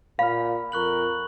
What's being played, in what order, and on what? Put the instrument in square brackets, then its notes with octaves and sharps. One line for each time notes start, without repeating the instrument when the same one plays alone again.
[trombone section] A#2 [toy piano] F5 [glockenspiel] B5 F6
[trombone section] F2 A#4 [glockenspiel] C#6 F#6 F#7